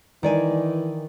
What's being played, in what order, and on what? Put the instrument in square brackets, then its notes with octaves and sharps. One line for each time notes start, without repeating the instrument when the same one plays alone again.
[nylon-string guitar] D#3 D5 G#5 [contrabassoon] E3